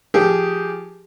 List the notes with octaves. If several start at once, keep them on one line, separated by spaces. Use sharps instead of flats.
F3 G4 G#4